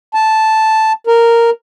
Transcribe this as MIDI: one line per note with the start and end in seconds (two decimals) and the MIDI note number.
0.14 0.92 81
1.07 1.50 70